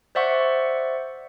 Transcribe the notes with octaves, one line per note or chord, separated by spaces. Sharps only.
C5 D5 E5 F#5 C#6